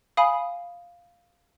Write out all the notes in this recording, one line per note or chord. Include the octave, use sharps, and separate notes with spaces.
F5 G#5 B5 D#6